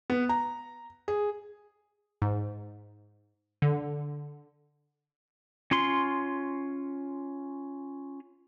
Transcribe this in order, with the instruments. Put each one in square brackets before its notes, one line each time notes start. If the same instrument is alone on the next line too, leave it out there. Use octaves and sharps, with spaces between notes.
[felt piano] B3
A#5
G#4
[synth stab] G#2
D3
[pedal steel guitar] C#4 F4 C6